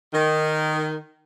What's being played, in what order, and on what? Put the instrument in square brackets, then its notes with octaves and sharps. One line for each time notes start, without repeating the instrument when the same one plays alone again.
[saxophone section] D#3